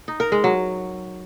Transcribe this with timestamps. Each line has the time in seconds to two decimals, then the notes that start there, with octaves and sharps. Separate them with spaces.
0.08 D#4
0.20 A#4
0.32 G#3
0.44 F#3